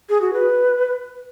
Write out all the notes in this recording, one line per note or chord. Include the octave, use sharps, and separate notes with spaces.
G#4
F#4
B4